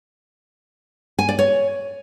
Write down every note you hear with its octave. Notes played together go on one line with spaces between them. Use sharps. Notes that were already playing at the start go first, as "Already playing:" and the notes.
G#5
D5
C#5